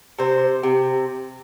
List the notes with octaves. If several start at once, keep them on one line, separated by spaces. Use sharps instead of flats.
C3 C5
C3